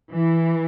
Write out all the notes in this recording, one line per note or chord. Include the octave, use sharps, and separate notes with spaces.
E3